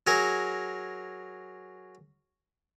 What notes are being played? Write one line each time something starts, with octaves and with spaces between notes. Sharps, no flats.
F#3 G#4 A#4